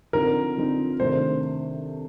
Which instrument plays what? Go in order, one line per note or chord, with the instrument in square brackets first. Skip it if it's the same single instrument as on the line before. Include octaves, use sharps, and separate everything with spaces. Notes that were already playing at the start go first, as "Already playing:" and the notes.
[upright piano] D3 F3 C4 D#4 [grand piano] A#4
[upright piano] D3 F3 C4 D#4
[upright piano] C3 D#3 A3 D4 [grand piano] C5